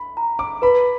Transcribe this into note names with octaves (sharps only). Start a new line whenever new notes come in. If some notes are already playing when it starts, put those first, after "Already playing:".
Already playing: B5
A#5
D6
B4 B5